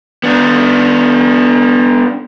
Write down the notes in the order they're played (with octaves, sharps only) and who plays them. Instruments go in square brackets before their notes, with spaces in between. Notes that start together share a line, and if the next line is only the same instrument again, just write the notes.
[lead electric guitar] B3 D4